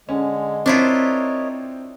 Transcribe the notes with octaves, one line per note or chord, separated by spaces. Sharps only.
D3 G#3 C#4
C4 D4 E4 F4 A#4 C#5 D#5